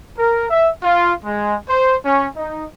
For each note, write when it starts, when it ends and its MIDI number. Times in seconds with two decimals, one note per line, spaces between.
0.17 0.47 70
0.50 0.70 76
0.83 1.13 65
1.24 1.55 56
1.68 1.97 72
2.05 2.27 61
2.37 2.65 63